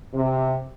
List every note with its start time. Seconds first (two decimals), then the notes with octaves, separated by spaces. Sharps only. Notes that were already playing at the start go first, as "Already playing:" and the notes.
0.14 C3